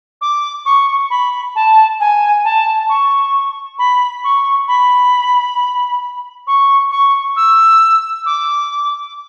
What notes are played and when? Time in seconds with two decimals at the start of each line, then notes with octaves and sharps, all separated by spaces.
0.21 D6
0.66 C#6
1.10 B5
1.55 A5
2.00 G#5
2.45 A5
2.89 C#6
3.79 B5
4.24 C#6
4.68 B5
6.47 C#6
6.91 C#6
7.36 E6
8.26 D6